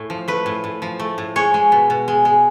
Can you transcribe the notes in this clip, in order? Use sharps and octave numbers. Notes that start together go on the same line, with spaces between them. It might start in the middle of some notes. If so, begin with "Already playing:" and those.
Already playing: A2 A3
F3
A3 B4
A2
A2
F3
A3
A2
G#3 C#5
G#3
B2
B2
G#3
G#3